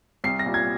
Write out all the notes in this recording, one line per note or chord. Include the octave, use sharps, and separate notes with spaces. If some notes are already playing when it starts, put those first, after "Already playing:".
C2 C7
A#6
A#2 G3
G#6